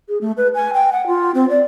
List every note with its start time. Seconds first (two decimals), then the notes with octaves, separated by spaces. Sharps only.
0.09 G#4
0.21 A3
0.37 B4
0.54 G#5
0.74 G5
0.92 F#5
1.07 F4
1.35 C4
1.50 D5